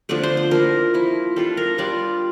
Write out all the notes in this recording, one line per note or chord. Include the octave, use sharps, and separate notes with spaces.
D3 F3 A3 D5
C5
C5
F3 A#3 E4 A#4
F3 A#3 E4
G3 D4 F4 A4
A#4
G3 D4 F4 D5